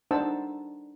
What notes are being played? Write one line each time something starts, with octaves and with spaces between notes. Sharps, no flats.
D4 D#4 C5 F#5 A5 E6